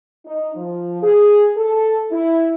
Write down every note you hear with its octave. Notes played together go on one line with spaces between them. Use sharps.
D#4
F3
G#4
A4
E4